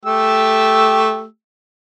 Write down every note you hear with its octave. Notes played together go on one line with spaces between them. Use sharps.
A3 G4 E6